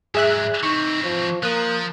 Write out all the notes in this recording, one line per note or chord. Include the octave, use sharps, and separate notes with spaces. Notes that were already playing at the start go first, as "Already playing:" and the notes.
G#2 F#3 G#4 E5 F#6
E3 C4 D#4 C#6
F3
F3 A#3 A#5 D#6 F#6